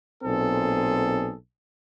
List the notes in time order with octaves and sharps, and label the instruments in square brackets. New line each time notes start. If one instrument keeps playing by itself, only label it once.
[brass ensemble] B1 A#2 C4 G#4 A4